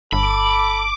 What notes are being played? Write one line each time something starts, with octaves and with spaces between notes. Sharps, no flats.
G1 A4 B5 D6